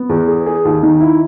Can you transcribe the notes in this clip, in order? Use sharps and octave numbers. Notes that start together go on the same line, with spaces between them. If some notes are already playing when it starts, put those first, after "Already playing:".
Already playing: B3
E2
G#4
G#4
D#2
D#3
E4